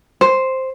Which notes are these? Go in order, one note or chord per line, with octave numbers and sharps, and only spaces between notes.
C5